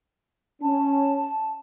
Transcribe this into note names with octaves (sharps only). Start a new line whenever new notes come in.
C#4 A5